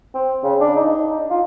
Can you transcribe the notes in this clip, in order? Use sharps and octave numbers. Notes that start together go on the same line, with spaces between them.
C4
C#3
D4
D#4
F4